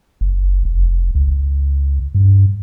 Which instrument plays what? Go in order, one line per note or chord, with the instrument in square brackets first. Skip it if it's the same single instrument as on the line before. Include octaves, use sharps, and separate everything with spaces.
[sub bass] F#1
F1
C#2
G2